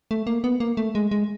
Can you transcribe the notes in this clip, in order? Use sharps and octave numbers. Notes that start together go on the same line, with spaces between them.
A3
A#3
B3
A#3
A3
G#3
G#3